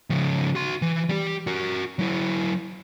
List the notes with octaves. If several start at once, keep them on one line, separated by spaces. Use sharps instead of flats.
C#3 F3
F#4 C6
E3
G3 G4
F#4 A#4
F#3 E4